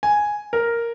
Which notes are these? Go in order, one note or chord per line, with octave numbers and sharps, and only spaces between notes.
G#5
A#4